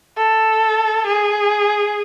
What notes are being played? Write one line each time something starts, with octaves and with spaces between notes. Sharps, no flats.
A4
G#4